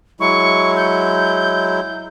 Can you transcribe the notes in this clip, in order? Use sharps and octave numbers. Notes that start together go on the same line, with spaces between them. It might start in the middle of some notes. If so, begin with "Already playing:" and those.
F#3 G#3 E4 C#6
G6